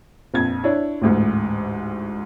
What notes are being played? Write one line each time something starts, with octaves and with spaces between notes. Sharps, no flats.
A#1 F2 G#6
D4 E4 C#5
A1 D2 G#2